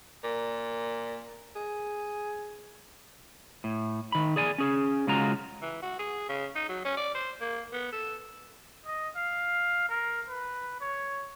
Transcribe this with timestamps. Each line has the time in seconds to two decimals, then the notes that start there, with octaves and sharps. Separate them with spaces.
0.24 A#2
1.56 G#4
3.64 A2
4.12 D#3 B5
4.36 G#4 D5 G#5
4.58 C#4 G#4
5.07 C#3 G#3 F4 F#4 A#5
5.62 E3
5.82 F#4
5.99 G#4
6.29 C#3
6.56 D#4
6.69 F#3
6.85 C#4
6.97 D5
7.15 C5
7.41 A#3
7.73 B3
7.93 A4
8.86 D#5
9.16 F5
9.89 A#4
10.28 B4
10.80 C#5